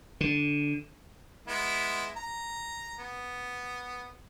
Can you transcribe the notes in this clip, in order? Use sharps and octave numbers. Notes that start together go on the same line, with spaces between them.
D3
G#3 B3 E4
A#5
B3